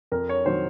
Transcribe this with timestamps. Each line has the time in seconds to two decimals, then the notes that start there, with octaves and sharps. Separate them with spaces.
0.12 F2 A#4
0.29 C#5
0.46 D#3 F#3 C5